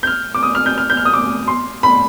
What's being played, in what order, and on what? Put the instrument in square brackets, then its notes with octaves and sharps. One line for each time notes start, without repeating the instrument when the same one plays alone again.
[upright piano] G6
F6
D6
D#6
F6
G6
F6
G6
F6
D#6
D6
C6
B5